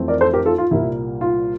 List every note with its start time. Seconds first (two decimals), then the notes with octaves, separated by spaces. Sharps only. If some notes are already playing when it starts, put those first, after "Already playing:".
Already playing: F2 E3 A3 C4
0.08 A#4 D5
0.21 A4 C5
0.33 G4 A#4
0.46 F4 A4
0.58 F4
0.71 C2 A#2 G3 A#3 E4
1.21 F4